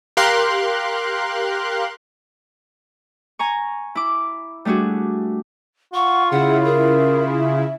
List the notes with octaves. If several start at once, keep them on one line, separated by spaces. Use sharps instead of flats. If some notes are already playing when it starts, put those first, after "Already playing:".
G4 A#4 F5 C6 F#6
G#5 A#5 C#6
E4 D6
G3 A3 D4 F#4 G#4
F4 F#5 C#6
C#3 E4 G#4 F#5
G#4 A#4
E5